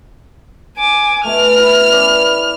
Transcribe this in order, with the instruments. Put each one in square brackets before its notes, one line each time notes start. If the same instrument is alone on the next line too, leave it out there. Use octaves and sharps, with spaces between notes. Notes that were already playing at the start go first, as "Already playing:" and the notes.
[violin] G#5 D6
[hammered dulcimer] B2 A3 [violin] F6
[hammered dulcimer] E4
C#4 B4 D5